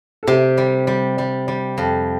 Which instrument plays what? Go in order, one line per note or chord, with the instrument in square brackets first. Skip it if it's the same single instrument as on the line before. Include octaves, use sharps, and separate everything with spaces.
[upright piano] A4
[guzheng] C3 [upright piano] G4
[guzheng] G3
G3
G3
G3
F2